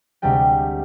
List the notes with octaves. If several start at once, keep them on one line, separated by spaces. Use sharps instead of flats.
D2 C3 G3 G#3 G5